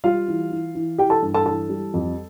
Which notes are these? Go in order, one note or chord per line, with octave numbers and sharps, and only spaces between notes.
G3 F4 F5
E3
E3
E3
E3 G4 G5
A4 A5
G2
A4 A5
E3 A4 A5
G3
F2